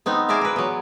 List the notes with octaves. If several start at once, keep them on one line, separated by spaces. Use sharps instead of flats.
B3 C4 D#4
G#4 A#4 D5 E5 F5
A#4 B4
F#3 B3